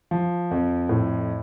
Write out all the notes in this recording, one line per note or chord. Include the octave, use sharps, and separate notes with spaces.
F3
F2
A2